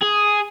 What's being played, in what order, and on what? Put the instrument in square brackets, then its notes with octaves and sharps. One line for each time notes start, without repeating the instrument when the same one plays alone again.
[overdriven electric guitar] G#4